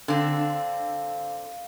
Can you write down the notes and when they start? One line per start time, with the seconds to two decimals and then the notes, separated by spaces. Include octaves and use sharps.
0.08 D3 C4 F5